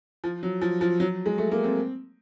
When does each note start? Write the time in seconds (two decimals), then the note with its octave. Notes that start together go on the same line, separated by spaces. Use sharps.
0.24 F3
0.43 F#3
0.61 F3
0.81 F3
1.00 F#3
1.26 G#3
1.38 A3
1.52 A#3
1.64 C4